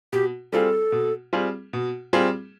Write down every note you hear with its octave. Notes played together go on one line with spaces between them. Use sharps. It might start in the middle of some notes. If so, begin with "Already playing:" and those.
B2 G4
G3 C4 F4 G#4 A4
B2
G3 C4 F4 G#4
B2
G3 C4 F4 G#4